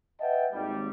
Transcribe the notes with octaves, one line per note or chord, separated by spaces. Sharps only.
B4 D#5 E5 F#5 G5 A5
G#1 D#2 G3